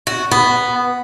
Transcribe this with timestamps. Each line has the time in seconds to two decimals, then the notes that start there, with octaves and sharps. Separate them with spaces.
0.07 F#4
0.31 B3